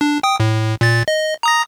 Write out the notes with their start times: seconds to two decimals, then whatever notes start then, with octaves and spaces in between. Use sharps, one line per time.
0.01 D4
0.23 G5 D#6
0.40 A2
0.81 A#2 A6
1.08 D#5
1.43 A#5 D#6 A#6